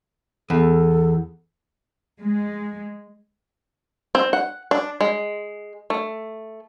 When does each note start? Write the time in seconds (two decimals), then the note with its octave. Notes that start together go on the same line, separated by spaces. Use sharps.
0.50 E2 A4
2.20 G#3
4.15 C4
4.33 F#5
4.71 D4
5.01 G#3
5.90 A3